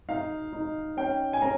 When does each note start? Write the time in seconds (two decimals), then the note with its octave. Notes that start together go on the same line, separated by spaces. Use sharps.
0.09 D#4 F5
0.53 D#4
0.97 C#4 G5
1.33 G#5
1.42 C#4 A#5